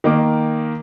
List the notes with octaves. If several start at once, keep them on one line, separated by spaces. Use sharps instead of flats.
D#3 A#3 D6